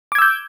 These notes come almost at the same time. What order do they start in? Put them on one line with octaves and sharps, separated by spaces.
D6 G#6 E6 G6